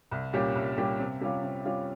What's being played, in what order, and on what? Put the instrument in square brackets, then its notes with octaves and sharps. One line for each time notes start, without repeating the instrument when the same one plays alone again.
[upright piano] C2
A#2 G3 C#4 G4
C2
A#2 G3 C#4 G4
C3
G3 C#4 F4
C3
G3 C#4 F4